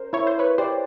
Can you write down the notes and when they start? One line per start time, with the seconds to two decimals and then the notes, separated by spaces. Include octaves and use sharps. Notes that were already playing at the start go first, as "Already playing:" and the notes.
Already playing: C#4 A#4 C5
0.13 E4 C#5
0.27 C5
0.39 B4 C#5
0.58 G4 C5 D5